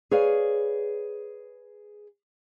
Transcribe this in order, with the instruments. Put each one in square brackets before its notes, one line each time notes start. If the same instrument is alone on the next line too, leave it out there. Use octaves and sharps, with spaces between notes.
[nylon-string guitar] G#4 B4 C#5 D5 F5